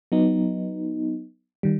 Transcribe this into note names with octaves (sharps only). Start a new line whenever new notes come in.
F#3 B3 D#4
D#3 G3